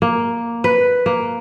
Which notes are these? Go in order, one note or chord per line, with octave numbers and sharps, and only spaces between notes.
A#3
B4
A#3